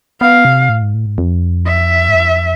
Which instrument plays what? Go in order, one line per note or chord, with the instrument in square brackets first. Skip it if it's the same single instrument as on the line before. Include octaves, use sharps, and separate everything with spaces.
[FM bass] B3 [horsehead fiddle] F5
[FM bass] C3
A2
G#2
A2
G#2
F2
[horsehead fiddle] E5
[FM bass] G#2
F2